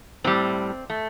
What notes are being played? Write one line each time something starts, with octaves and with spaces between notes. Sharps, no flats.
A2 G3 C4
A3